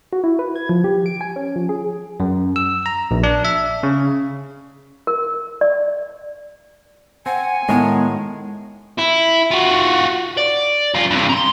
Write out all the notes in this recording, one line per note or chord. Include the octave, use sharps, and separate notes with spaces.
F#4
E4
B4
G#6
F3
G4
D7
G#5
C#4
F3
G#4
F#2
E6
A#5
A#1
D4
E5
C#3
A#4
D5
C4 F#5 G#5
A2 D#3 G#3 B3
E4
F4 F#4
D5
F#2 F4
G2 C3
A#5 C6